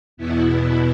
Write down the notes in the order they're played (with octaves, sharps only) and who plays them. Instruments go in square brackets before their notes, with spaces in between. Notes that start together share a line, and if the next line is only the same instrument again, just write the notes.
[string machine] E2 B2 B3 E4